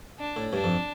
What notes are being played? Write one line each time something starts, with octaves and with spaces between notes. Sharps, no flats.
D4
A2
G2 D4
F2